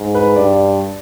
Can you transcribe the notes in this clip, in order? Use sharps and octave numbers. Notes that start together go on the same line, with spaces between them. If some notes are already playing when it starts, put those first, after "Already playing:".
Already playing: G#2
B4
G2 D5